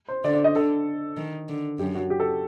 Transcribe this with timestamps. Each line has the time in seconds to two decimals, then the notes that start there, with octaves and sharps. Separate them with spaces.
0.08 C5
0.24 D3 D5
0.34 D5
0.44 D#5
0.55 D3 A4
1.17 D#3
1.49 D3
1.79 F#2 G4
1.95 F#4
2.10 G4
2.20 A4